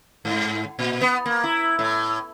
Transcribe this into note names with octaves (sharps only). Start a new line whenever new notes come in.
G#2
A#2
B3
A#3
E4
A2